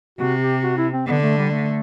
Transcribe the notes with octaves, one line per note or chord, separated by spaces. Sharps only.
C3 F#4
G4
F#4
E4
C4
D3 B3
A3
G3
A3